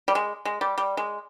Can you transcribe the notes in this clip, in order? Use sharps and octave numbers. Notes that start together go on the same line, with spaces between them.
G3
G#3
G#3
G3
G3
G#3